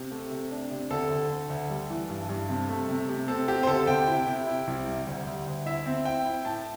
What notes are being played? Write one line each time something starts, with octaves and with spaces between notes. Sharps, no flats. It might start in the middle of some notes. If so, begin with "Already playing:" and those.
Already playing: C3
A3
C3
D4
C3
D2 A4
D2
D3
D2
G3
E3
G2
G2
C3
A3
C3
C3
C4 A4
C4 G4
C5
D2 A4
C3 G5
E4
C3
E4
C2
G3
D2
D2
D2
E4 E5
C4
E4 G5
E4
A2 A5